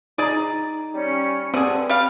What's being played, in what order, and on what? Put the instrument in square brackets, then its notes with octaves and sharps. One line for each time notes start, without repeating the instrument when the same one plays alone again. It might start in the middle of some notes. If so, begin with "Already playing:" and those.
[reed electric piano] D#4 A#5 [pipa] G#4 D5
[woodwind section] G3 C#4
[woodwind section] G2 G#5 [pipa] D3 G#4 [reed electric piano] C4
[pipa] G3 F5 [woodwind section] B4 F6